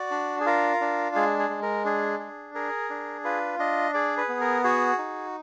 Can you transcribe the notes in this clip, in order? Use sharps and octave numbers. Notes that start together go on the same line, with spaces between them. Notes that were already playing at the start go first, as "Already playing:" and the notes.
Already playing: F#4 D5
D4
G#4
F4 A#4
D4
G#3 G#4
G#4
G#3
A#4
D4 G#4
G#4
G#4 A#4
D4
F4 B4
D4 D#5
G#4 D5
B4
B3
A#4
F#4 G#4
D#4